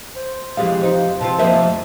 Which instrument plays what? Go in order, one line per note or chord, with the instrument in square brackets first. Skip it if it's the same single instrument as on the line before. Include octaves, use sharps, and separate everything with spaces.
[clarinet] C5
[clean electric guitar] F2 G4 F5 [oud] E3 G#3
[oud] D#4 [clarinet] C5
[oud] C3 C4 F4 [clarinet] A5
[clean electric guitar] F2 E5 [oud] A#3 C5 D#5
[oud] A3